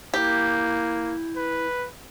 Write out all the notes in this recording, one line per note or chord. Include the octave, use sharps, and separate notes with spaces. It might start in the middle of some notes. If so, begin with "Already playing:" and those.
A#3 E4 G4
B4